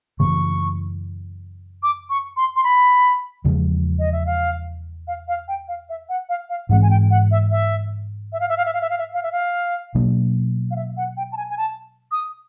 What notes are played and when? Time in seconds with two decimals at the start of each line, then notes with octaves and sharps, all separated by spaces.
0.20 F#2 C#3 E3 A3 C#6
1.83 D6
2.10 C#6
2.37 C6
2.56 C6
2.64 B5
3.45 E2 C#3 F3 G#3
3.99 D#5
4.12 E5
4.26 F5
5.07 F5
5.28 F5
5.48 G5
5.68 F5
5.89 E5
6.09 F#5
6.29 F5
6.49 F5
6.69 G#2 E3 G#3 C4 F#5
6.82 G#5
6.90 G5
7.10 F#5
7.31 E5
7.51 E5
8.33 E5
8.40 F5
8.49 E5
8.57 F5
8.65 E5
8.74 F5
8.81 E5
8.90 F5
8.98 E5
9.14 F5
9.23 E5
9.32 F5
9.95 B2 F#3 A#3 D4
10.71 F5
10.76 E5
10.97 F#5
11.17 G5
11.32 A5
11.37 G#5
11.49 G#5
11.58 A5
12.11 D#6